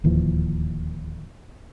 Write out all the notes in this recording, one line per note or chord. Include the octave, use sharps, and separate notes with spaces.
D1 D#2 E3 F3